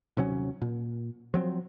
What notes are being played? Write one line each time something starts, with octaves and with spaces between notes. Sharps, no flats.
D#1 C3 F#3 C#4
A#2
F3 F#3 C4